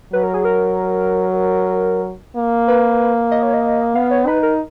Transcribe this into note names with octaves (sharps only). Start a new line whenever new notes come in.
F#3 B4
A#4
G#4
A#4
A#3
B4
D#5
C#5
D#5
B3 F5
C#5
D#4 B4
A#4